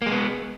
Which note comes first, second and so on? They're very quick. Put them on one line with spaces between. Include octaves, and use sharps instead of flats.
A#3 G#3 B3